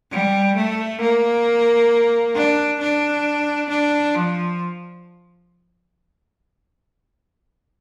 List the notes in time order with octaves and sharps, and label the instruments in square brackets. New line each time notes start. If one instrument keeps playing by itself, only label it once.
[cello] G3
A3
A#3
D4
D4
D4
F3